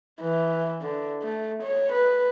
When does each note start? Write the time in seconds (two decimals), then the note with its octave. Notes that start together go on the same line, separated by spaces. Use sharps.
0.20 E3
0.82 D3
1.22 A3
1.63 C#5
1.92 B4